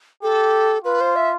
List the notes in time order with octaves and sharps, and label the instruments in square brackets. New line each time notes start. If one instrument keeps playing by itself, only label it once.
[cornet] G4 [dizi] A4
[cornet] F4 [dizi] B4
[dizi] C5
E5